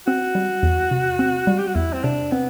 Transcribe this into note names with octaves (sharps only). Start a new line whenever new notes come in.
C4 F#4
G3
E2
C3
C4
G3
G4
F#4
E2 E4
C4
C3 D4
B3 C4